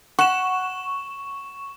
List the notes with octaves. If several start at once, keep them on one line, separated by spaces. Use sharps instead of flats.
F#5 C#6 E7